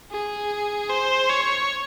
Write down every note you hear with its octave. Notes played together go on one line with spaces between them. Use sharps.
G#4
C5
C#5